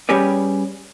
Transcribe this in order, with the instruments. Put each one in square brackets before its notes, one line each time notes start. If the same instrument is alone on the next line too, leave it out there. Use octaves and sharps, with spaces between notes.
[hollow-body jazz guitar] G3 C#4 G4 G#4 B4 D5